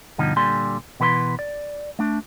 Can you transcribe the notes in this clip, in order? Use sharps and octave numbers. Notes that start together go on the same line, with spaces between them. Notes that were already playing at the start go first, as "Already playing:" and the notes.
G2 B2 D3 F3 D#4
A#2 D3 G3 G#5 C6
B2 E3 B4 D5 C6
D5
A3 D4